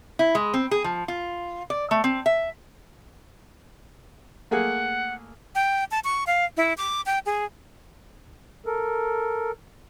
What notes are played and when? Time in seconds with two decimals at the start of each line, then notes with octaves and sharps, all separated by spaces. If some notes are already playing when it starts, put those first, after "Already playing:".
0.19 E4
0.35 G#3
0.54 C4
0.71 G#4
0.84 F3
1.08 F4
1.70 D5
1.91 A3
2.04 C4
2.26 E5
4.51 A3 A#3 G#4 F#5
5.55 G5
5.91 A5
6.04 C#6
6.27 F5
6.57 E4
6.78 D6
7.06 G5
7.26 G#4
8.66 A4 A#4